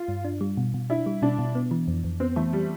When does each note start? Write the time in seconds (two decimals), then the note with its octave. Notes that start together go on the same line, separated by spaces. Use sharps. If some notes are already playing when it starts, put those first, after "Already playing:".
Already playing: F4
0.08 G2
0.25 D4
0.41 G3
0.57 B2
0.74 B2
0.90 D4 E4
1.06 G3
1.22 B2 D4
1.39 B2
1.55 B3
1.71 E3
1.88 F2
2.04 F2
2.20 B3 C4
2.36 E3 A3
2.53 G3